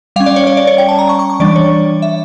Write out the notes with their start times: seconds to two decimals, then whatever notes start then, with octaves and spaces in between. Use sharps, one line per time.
0.16 G3 F5
0.20 C#4
0.26 D5
0.36 C#5
0.47 D5
0.57 D5
0.67 C#5
0.78 G5
0.89 A5
0.99 A#5
1.09 C#6
1.19 C#6
1.30 C#6
1.40 E3 G3 D4 D5
1.56 C#5
2.02 E5